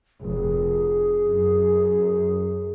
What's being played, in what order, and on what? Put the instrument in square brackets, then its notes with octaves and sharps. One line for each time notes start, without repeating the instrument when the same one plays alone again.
[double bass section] F1 [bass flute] G#4
[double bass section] F#2